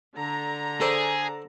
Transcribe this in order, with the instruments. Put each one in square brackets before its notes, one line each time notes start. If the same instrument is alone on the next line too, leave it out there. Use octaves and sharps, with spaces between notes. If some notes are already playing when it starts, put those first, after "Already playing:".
[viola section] D3 A#5
[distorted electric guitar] G#4 [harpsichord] A4 C5 D5